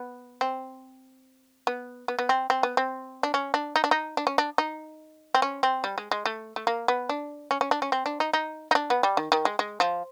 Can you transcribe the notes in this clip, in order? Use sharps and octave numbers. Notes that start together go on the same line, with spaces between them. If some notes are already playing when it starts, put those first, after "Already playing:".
Already playing: B3
C4
B3
B3
B3
C4
C4
B3
C4
D4
C#4
D4
D#4
D4
D#4
D4
C#4
D4
D#4
C4
C#4
C4
G3
G#3
G#3
A3
A3
A#3
B3
D4
C#4
C#4
D4
C#4
C4
D4
D#4
D#4
D#4
D4
B3
G3
D#3
D#3
G#3
G#3
F3